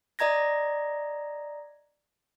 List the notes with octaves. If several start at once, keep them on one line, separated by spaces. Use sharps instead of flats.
D5 D#5 A#5 G#6 A#6